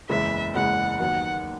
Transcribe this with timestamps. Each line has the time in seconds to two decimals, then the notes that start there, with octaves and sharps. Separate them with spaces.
0.09 F#1 E2 C#3 E3 G#3 E5
0.54 F#1 E2 C#3 E3 G#3 F#5
0.99 D#2 D#3 F#3 B3 F#4 F#5